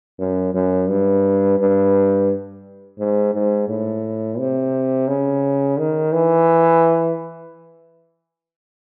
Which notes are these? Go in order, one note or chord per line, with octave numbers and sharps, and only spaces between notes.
F#2
F#2
G2
G2
G#2
G#2
A2
C3
C#3
D#3
E3